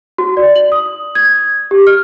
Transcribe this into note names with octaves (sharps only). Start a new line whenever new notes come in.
F#4
D5
F#7
D#6
G#6
G4
F6